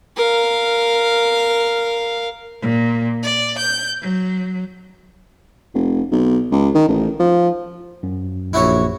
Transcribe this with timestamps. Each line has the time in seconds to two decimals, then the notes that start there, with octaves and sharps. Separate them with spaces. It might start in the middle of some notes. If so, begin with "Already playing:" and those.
0.16 A#4 F5
2.62 A#2
3.22 D5
3.58 G6
4.01 F#3
5.74 F1
6.12 B1
6.51 C#2
6.75 D#3
6.89 A1
7.20 F3
8.03 F#2
8.53 A#1 E4 F#4 C#5